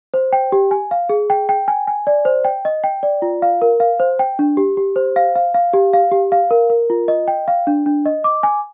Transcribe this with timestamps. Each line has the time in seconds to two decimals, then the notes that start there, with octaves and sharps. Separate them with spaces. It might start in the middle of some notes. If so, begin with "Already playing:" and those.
0.14 C5
0.33 G5
0.52 G4
0.71 G#5
0.91 F5
1.09 G#4
1.30 G5
1.49 G5
1.68 G#5
1.88 G#5
2.07 D5
2.25 C5
2.45 G5
2.65 D#5
2.84 G5
3.03 D5
3.22 F4
3.42 F5
3.62 A#4
3.80 F5
4.00 C5
4.19 G5
4.39 D4
4.57 G4
4.77 G4
4.96 C5
5.16 F5
5.35 F5
5.54 F5
5.73 G4
5.93 F5
6.12 G4
6.32 F5
6.51 A#4
6.70 A#4
6.90 F4
7.08 D#5
7.28 G5
7.48 F5
7.67 D4
7.86 D4
8.06 D#5
8.24 D6
8.43 G#5